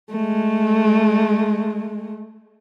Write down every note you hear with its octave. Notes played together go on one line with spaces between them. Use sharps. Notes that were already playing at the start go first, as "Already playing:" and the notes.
G#3 A3